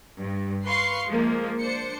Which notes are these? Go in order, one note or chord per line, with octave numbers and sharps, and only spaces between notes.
G2
B4 F5 C6 C#6 C7
F3 G#3 A#3
D4 C5 C#7